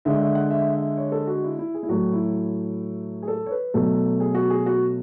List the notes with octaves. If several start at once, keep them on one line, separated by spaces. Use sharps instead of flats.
D3 G#3 E5
E5
F#5
E5
E5
C#5
A4
F#4
E4
E4
G#4
E4
A2 F#3 A3 F#4
E4
G#4
A4
C#5
B4
B2 F#3 A3 A4
G#4
F#4
G#4
F#4